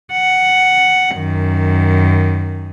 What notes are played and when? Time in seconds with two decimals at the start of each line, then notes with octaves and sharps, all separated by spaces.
0.13 F#5
1.13 F#2 D#3